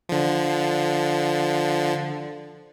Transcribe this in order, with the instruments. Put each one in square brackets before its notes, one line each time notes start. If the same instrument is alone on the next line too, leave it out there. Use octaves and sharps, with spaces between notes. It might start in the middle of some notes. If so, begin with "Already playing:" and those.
[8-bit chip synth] D3 F3